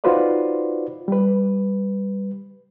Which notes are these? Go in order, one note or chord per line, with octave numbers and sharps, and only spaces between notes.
D#4 F4 F#4 B4 C5 D5
G3 B4